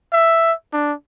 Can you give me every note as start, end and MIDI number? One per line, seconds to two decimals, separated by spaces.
0.13 0.53 76
0.73 0.93 62